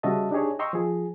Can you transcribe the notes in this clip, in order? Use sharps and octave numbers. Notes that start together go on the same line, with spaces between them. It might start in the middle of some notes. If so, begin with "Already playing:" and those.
C#3 G3 F#4 D#5 E5 A5
D4 D#4 G4 G#4 C#5
D#5 G5 A#5 C6 C#6 E6
F3 G#4